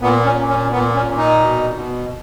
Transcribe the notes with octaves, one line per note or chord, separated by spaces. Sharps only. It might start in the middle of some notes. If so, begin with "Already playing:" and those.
A#2 B3
C#4
A#2
C#4
A#2 B3
C#4
A#2
D#4
B2
B2